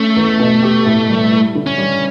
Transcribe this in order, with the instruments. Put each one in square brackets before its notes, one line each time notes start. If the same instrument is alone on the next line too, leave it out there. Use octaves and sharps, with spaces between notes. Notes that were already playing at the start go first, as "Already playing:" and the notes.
Already playing: [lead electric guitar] A3 [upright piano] C#4
[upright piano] E2
B2
G4
A2
G3
E4
D3
[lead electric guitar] C#4
[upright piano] G3